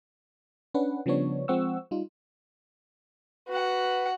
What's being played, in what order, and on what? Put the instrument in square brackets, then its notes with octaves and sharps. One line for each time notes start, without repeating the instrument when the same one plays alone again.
[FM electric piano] C#4 D4 B4 F#5
C#3 F3 G3 B3 D4 C#5
F3 G#3 C4 F#5 C#6 E6
G3 D#4 F4
[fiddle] F#4 F#5 [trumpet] B4